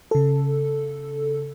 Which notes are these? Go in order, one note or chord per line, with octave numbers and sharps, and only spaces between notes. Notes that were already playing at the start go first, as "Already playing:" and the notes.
C#3 A4